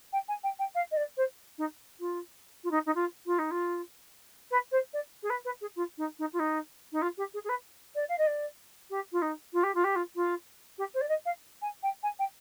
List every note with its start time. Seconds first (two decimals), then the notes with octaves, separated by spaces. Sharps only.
0.13 G5
0.28 G#5
0.44 G5
0.59 G5
0.75 F5
0.91 D#5
0.97 D5
1.17 C5
1.58 D#4
2.00 F4
2.64 F4
2.71 D#4
2.86 D#4
2.95 F4
3.26 F4
3.39 D#4
3.51 F4
4.51 B4
4.72 C5
4.93 D5
5.23 G#4
5.30 B4
5.45 B4
5.61 G#4
5.76 F4
5.98 D#4
6.19 D#4
6.33 F4
6.39 D#4
6.92 D#4
7.02 F4
7.17 G4
7.34 G#4
7.44 G#4
7.49 B4
7.95 D5
8.09 F5
8.18 D#5
8.27 D5
8.90 G4
9.12 F4
9.22 D#4
9.53 F4
9.63 G4
9.75 F4
9.84 G4
9.96 F4
10.15 F4
10.78 G4
10.94 C5
11.01 D5
11.09 D#5
11.26 F5
11.62 G#5
11.83 G5
12.03 G#5
12.19 G5